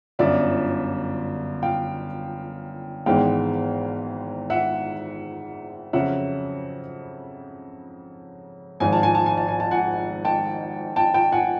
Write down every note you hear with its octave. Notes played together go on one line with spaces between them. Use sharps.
G1 F#2 D3 D5 E5
F5 G5
G#1 G#2 E3 G#3 B3 F5 G5
E5 F#5
F2 C#3 F#3 E5 F#5
G#1 G#2 F3 G#5
A5
G#5
A5
G#5
A5
G#5
A5
F#5 G#5
G5 A5
G5 A5
G5 A5
F#5 G#5